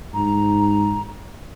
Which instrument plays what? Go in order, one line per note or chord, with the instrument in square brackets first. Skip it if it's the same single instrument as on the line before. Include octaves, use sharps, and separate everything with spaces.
[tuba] G#2 [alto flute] A#5